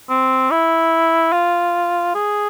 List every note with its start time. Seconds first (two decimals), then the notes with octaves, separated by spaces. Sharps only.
0.10 C4
0.51 E4
1.33 F4
2.15 G#4